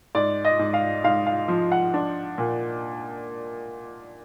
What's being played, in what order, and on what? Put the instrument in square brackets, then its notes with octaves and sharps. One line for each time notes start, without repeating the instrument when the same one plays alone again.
[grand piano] G#2 D5
D#5
G#2
F5
G#2 F5
F5
F3
F#5
D4
A#2